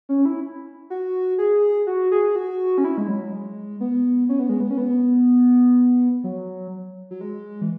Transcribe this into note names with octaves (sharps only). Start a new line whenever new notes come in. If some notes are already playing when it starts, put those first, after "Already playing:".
C#4
E4
F#4
G#4
F#4
G#4
F#4
C#4
E4
G#3
F#3
G#3
B3
C#4
B3
G#3
B3
C#4
B3
F#3
F#3
G#3
E3